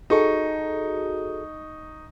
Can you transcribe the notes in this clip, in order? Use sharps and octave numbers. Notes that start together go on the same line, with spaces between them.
D#4 F#4 G#4 A4 C#6